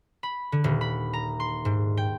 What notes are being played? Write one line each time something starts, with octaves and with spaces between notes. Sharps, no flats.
B5
D3
D#1
B5
A#5
C6
G#2
G5